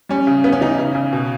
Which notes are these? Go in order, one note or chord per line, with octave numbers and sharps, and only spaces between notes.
G3 C#4
C#3
C#3 B3
C#4
E3 D#4
C#3
C#3
B2